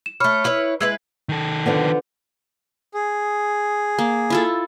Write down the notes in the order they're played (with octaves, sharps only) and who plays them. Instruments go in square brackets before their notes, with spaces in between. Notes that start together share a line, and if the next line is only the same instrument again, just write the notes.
[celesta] E7
[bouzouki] A3 C#5 [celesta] B5 F6
[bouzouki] E4 B4 C#5
[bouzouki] G#3 E4 B4 [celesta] E6 G#6
[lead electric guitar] D#3 A4
[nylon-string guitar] D3 F3 B3
[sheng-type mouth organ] G#4
[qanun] A#3
E4 F4 A4